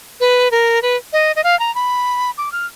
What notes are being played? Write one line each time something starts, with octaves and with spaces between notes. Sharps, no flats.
B4
A#4
B4
D#5
D#5
F5
A#5
B5
D6
F6